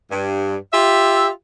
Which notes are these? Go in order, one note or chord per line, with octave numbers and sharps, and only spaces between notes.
G2
F4 G4 E5